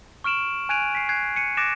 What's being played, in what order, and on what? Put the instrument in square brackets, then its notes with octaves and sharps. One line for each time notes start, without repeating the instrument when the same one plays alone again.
[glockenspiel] C#6 F6 D7 E7 F#7
G#5 F#6 G#6 D7 D#7 F7
B6 C7
F#6 G#6 C7
C#7 D#7
D6 F#6 A6 A#6 D7 E7